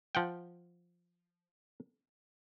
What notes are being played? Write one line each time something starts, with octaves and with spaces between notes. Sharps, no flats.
F3 F#5 G5